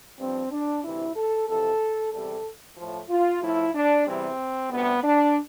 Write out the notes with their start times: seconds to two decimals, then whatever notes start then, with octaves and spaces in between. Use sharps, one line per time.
0.19 G2 F3 C4
0.51 D4
0.83 D2 C3 E3 E4
1.16 A4
1.48 F2 C3 E3 A4
2.12 E2 C3 G3 A4
2.77 A2 F3
3.09 F4
3.42 A2 F3 E4
3.74 D4
4.06 E2 C3 E3 G3 C4
4.70 D2 C3 G3 B3
5.03 D4